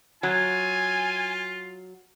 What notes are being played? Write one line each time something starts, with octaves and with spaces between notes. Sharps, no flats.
F#3 F4 G#5